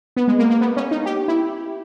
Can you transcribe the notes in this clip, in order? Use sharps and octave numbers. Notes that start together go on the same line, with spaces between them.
B3
G#3
A#3
A#3
B3
C#4
D#4
G4
E4